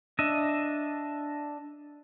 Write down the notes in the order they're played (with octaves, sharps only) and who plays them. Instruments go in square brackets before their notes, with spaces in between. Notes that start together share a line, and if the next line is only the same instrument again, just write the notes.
[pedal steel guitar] D4 D#5 E5